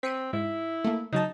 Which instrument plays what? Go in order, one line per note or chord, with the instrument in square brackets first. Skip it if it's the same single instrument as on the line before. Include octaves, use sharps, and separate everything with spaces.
[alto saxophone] C4 [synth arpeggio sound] B6 C#7 D#7
[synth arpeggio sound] G#2 [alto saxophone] E4
[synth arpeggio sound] A3 A#3
[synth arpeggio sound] C#3 F#3 A5 [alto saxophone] D#4